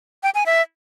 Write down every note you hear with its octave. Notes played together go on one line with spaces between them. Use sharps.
G5
G#5
E5